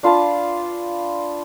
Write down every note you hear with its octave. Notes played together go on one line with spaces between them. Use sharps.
D4 F4 B4 A5